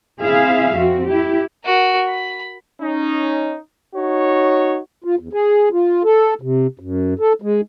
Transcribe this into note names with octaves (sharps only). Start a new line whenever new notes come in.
C4 E4 G#4 E5 F5
F2 C4 F#4
E4 G4
F#4 A#4
B5
C#4 D#4
D#4 F#4 C#5
F4
E2
G#4
F4
A4
C3
F#2
A4
G#3